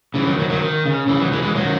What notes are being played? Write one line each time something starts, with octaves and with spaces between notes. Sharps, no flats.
C#3 E3
D#3 F#3
D#3 F#3
D#3 F#3
D#3
C#3
C#3 E3
D#3 F#3
E3 G#3
E3 G#3
D#3 F#3